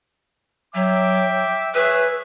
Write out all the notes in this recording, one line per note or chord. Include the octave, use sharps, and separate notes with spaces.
F#3 E5 G5 D6
G#4 B4 C#5 E5